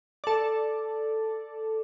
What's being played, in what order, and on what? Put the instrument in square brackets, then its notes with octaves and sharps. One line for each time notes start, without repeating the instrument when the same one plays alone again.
[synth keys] A4 D5